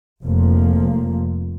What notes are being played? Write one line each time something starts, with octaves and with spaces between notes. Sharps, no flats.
F1 F2 F3 A#3